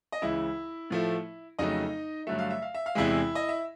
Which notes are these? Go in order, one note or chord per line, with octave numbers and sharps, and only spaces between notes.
D#5
C#2 C#3 E3 E4 E5
A2 F3 A3
F2 C#3 F#3 A3 D#4 D#5
G2 D3 F#3 A3 E5
F5
E5
F5
E5
F5
E2 C3 E3 G#3 E4 E5
D#5
E5